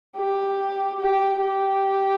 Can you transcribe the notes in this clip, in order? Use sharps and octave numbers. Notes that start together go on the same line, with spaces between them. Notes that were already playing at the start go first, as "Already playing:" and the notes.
G4
G4
G4